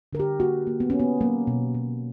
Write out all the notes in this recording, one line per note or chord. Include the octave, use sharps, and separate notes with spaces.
D3 A#4
G4
A#3 F#4
A#3
B3
A#3 C#4
B3
F#3 A#3
B2
B2